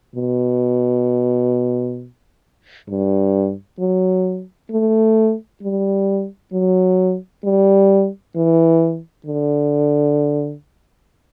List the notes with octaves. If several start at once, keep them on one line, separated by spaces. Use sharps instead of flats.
B2
G2
F#3
A3
G3
F#3
G3
E3
D3